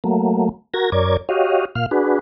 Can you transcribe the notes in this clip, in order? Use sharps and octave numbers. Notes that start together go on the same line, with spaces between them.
F#3 A3 A#3
F#4 A#4 G#6 A#6
F#2 A#4 C#5 D5 D6 G#6
F#4 G4 C#5 D#5 F5
A#2 F5 F6
D4 F#4 G#4 B4